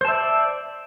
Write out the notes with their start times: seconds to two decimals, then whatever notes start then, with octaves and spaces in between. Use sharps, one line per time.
0.01 C5
0.05 A5
0.08 E5
0.12 D5